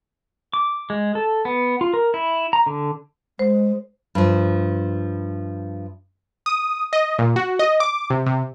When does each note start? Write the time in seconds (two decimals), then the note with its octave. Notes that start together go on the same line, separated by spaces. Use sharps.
0.54 D6
0.90 G#3
1.15 A4
1.45 B3
1.81 F4
1.94 A#4
2.14 E4
2.53 A#5
2.66 D3
3.39 G#3 C5
4.15 G2 F3
6.46 D#6
6.93 D#5
7.19 A#2
7.36 F#4
7.59 D#5
7.80 D6
8.10 C3
8.26 C3